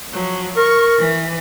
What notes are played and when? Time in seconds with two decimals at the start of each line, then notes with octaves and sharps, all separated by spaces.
0.12 F3 F#3
0.57 A#4 C#6
0.97 E3